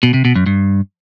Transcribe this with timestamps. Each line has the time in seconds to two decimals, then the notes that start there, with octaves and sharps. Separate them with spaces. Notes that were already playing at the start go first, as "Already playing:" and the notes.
0.03 B2
0.14 C3
0.25 B2
0.36 F#2
0.46 G2